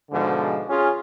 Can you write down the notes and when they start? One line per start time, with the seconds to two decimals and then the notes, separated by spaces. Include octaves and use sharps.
0.11 G#2 B2 D3 F3
0.68 C#4 F4 G#4